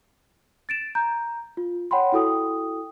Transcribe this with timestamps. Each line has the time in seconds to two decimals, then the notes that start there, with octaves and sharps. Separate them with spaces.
0.69 A6 D7 E7
0.95 A#5 G6
1.57 F4
1.91 C#5 F#5 G5 B5 C6
2.12 E4 F#4 A4 G5 D#6